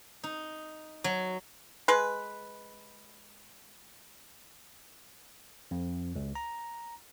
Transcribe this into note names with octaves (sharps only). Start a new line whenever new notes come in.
D#4
F#3
G#3 B4
F2
C#2
A#5